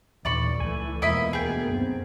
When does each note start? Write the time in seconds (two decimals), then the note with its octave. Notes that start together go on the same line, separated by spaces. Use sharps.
0.25 A1 D#2 A#2 D#3 D5 B5 C#6
0.60 C#2 E3 F3 A3 G#5
1.02 E2 B2 F3 G#3 A#3 E4 D#5 B5
1.33 D2 A#3 B3 G#4 G5
1.69 F#2 D#3 C4